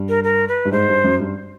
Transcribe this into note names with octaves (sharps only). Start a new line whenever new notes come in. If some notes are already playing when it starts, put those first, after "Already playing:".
Already playing: G2
A#4
A#4
B4
G2
G#2 C5
G2
F#2
G2